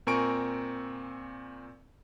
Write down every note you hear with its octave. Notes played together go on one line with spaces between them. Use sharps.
A#2 C4 A#4 G#5 C#6 D7